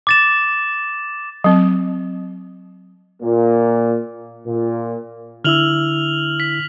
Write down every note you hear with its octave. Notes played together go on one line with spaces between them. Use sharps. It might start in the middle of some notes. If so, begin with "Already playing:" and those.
D6 A6 E7
F#3 C4
A#2
A#2
D3 E4 E6 F6 F7 F#7
B6